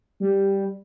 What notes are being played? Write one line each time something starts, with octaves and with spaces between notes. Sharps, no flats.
G3